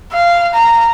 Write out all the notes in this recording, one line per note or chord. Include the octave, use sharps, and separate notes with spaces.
F5
A#5